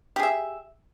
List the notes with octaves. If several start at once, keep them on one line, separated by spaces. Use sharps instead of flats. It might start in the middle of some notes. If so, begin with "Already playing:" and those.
G4 G#4 E5